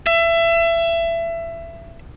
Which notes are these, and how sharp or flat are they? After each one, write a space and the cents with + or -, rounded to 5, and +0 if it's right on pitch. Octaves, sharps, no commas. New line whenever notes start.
E5 +25